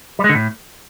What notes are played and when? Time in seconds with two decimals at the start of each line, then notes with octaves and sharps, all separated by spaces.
0.19 G3
0.24 G#3
0.29 D3
0.35 A2